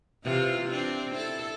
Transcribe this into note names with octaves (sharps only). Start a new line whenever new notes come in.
C3 E3 F4
C4 D4
E4 A4